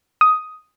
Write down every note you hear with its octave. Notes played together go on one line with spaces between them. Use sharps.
D#6